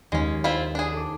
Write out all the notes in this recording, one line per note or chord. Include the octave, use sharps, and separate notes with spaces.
D#2 G#3 C#4
C4 E4 F4
D4 G#4
A4 D6